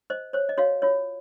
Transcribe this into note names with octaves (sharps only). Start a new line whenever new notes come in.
C5 D#5
C5 C#5
D#5
F#4 C#5 F5
F4 C#5